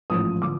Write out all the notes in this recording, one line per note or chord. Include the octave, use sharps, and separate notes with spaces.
A1 G#2 F3 D#6
D3 F3 D6